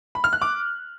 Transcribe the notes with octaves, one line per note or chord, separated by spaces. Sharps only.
B5
F6
F#6
D6